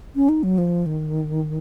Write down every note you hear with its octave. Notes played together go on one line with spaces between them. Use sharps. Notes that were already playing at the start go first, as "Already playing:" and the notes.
C#4
D#4
F#3
F3
D#3